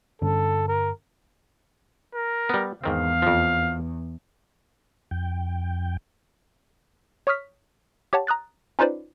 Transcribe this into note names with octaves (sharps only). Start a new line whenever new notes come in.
G2 D3 C#4 A4
A#4
A#4
G3 B3
E2 G#2 D#3 C4 F5
F2 F3
F2 G5
C#5 C#6 D#6 F6 B6
G4 C#5 F#5 A5
A#5 D#6 F#6 A6
C#4 D#4 F4 B4 C5 D5